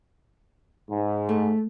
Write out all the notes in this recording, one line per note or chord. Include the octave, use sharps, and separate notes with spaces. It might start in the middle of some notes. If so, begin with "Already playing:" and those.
G#2
A3